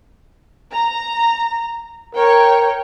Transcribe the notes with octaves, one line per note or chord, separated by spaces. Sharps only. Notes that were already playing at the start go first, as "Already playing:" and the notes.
A#5
A#4 C#5 G5